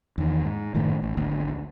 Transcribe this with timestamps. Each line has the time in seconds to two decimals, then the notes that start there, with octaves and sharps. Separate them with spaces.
0.18 E2 D#3
0.45 G#2
0.74 F#1 A2 D#3 A3
1.02 A1
1.17 G#1 D2